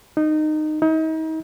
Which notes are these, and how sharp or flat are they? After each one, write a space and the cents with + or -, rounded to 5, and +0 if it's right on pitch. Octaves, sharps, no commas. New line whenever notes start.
D#4 -20
D#4 +35